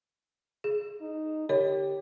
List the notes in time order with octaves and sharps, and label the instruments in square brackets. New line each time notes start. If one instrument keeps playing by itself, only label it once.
[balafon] G#4
[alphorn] D#4
[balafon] D3 C#5 D#5 [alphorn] G4